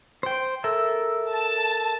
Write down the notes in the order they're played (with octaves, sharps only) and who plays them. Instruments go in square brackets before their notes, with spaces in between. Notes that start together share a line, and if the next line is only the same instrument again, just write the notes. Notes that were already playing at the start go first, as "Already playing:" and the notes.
[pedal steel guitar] C5 G5
A4 A#4 E5
[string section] A5